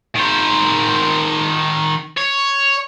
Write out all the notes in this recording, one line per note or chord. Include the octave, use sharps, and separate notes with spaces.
D#3 C5
C#5